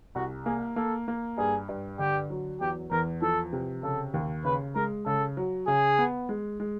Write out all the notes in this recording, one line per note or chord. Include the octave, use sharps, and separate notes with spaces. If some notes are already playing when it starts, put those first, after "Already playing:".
C2 F#4
A#3 G#4
A#3 A4
A#3
G2 G#4
G2
D3 G4
F#3
E2 G4
E2 A#4
F3 A4
C3
C#3 A4
D#2
C#3 B4
G#3 A#4
C#3 A4
F#3
C#3 G#4
B3
G#3
G#3